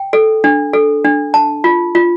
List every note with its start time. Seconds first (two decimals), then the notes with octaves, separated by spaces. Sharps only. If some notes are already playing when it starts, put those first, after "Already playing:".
Already playing: G5
0.13 A4
0.44 D4
0.73 A4
1.05 D4
1.34 A5
1.64 F4
1.95 F4